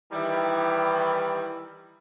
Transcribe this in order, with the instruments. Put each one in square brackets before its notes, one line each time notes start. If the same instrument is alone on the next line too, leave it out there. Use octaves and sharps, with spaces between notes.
[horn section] D#3 E3 G3